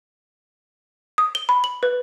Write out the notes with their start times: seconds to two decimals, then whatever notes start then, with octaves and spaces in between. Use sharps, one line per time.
1.18 D#6
1.35 G7
1.49 B5
1.64 F#7
1.83 B4